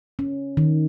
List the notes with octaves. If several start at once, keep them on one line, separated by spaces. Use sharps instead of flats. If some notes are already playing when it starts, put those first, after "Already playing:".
C#4
D#3